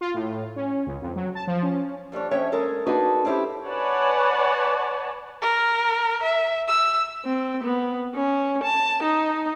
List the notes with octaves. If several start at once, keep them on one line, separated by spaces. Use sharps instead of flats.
F4
A2
C#4
C#2
F2
F#3
A5
F3
C#4
F2 G3 D4 C#5
F2 C#4 C#5 E5 G5
G#3 C#4 A4 A#4
D4 D#4 F#4 G#4 A4 B4
C4 C#4 E4 F4 G4
B4 C#5 D5 F#5 G#5 A5
A#4
E5
E6
C4
B3
C#4
A5
D#4